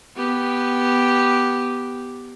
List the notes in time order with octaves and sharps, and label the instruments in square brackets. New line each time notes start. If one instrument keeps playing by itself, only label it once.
[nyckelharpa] B3 G4